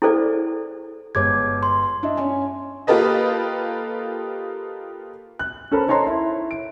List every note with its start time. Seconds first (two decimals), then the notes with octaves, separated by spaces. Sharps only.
0.02 E4 G#4 A4 C5 D5
1.15 G1 G#3 C#5 D6 G#6
1.63 C6
2.03 D4 D#5 E5
2.17 C#4 C#5 G#5
2.87 A#3 F4 G4 A4 B4 D#5
5.39 F#6
5.72 C#4 A4 A#4 C5 B5
5.88 D#4 C#5 A5 A#5 C6
6.07 E4
6.51 D7